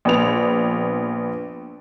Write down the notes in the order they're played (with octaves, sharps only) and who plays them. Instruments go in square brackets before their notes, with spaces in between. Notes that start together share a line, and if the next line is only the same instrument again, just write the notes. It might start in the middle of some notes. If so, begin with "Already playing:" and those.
[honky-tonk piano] A#1 B3 F7